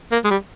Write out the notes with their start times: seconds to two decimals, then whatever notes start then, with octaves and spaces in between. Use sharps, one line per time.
0.12 A#3
0.24 G#3
0.31 G3